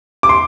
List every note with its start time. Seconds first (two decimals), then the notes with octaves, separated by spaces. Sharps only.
0.23 D6
0.29 C6